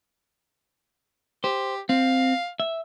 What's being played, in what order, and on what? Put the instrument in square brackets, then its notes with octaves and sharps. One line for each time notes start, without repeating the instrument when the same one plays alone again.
[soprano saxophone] G4 [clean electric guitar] C5
[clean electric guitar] C4 [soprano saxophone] F5
[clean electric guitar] E5